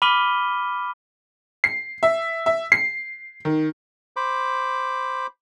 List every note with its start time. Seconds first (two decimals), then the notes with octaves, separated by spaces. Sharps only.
0.02 B5 D6 F6 B6 D#7 G7
1.64 C7
2.03 E5
2.46 E5
2.72 C7
3.45 D#3
4.16 C5 B5 D6